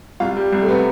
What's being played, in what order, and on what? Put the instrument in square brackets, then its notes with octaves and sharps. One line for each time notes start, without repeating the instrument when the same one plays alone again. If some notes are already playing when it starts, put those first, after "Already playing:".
[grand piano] C2 [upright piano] F4
[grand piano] G3
C2
[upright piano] A3
[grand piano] C3 [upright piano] B3